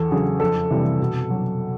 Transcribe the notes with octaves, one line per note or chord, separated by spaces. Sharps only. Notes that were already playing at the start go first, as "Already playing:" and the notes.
Already playing: E2 A4
C#3 F#3 G#4
F2 A4
C3 E3 G3
B2
F#3